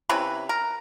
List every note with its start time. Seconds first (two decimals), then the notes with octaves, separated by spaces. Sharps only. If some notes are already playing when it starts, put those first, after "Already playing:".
0.09 C3 C#4 E4 B4
0.49 A#4